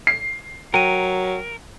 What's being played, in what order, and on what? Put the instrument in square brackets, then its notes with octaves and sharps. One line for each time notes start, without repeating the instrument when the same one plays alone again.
[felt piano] C7
[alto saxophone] F#3 [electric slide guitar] A#4 [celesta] G5 D#7